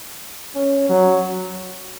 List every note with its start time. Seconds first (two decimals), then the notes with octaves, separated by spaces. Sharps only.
0.55 C#4
0.89 F#3